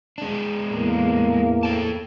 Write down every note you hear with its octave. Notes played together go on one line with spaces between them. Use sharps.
G#3 D4
E2 A2 A#3
A4 G5 A5